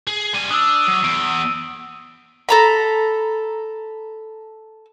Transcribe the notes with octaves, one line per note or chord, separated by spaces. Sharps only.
G#4
G3 G#5 D#7
D4 D#6 E6
F#3
E2 D7
A4 A#5 B5